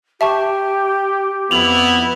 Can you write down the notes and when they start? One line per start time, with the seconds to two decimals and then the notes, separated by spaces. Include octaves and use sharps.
0.21 G4 E5 A5 C#6
1.51 F2 B3 E4 F7 F#7